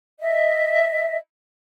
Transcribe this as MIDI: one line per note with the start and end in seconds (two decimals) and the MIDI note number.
0.20 1.17 75
0.20 1.17 76